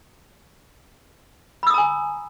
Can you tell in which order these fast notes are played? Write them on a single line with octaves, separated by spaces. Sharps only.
B5 E6 D#6 A#5 G#5